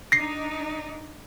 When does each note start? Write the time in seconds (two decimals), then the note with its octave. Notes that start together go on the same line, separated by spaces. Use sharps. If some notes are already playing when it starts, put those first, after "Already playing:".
0.12 D4 D#4 A#6 C7